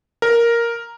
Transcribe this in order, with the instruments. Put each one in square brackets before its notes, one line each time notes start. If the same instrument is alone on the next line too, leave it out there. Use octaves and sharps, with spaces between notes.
[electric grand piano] A#4